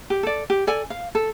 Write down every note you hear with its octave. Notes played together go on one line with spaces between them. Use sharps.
G4
A4 D5
G4
A4 D5 G#5
F5
A4